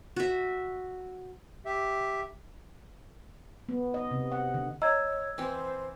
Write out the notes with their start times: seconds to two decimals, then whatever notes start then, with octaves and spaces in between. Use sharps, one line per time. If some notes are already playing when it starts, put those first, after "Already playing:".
0.16 F#4 E5
1.66 G4 E5
3.69 B3
3.94 D#5
4.11 C3
4.32 F#5
4.54 D3
4.82 C#5 D#5 A#5 E6 G#6
5.38 E3 C4 C5